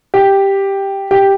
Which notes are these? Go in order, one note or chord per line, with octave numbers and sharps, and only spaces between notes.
G4
G4